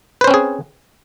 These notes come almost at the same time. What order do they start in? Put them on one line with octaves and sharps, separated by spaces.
B4 C5 C#4 C4 G#4